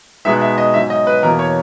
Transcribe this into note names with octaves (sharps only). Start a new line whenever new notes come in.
B2 G#3 B3 D#4 E5
E5
D#5
G#2 F#3 C#4 E5
D#5
B4
E2 B2 A#3 E4 A#4
C#5